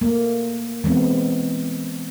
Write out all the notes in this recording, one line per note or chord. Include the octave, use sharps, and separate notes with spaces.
A3 A#3
E3 G#3 B3 C4